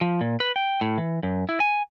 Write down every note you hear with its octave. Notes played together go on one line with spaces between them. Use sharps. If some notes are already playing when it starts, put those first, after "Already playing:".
F3
A#2
B4
G5
A2
E3
F#2
E4
G#5